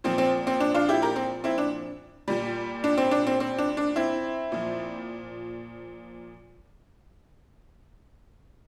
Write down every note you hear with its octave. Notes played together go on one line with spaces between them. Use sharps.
A#2 F3 C4
C4
C4
D4
D4 F4
E4 G4
G4 A#4
C4
C4 E4
D4
A#2 G3
D4
C4
D4
C4
C4
D4
D4
C4 E4
A#2 F3